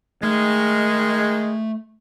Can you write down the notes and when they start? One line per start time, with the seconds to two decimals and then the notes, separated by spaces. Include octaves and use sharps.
0.23 D#3 G#3 A3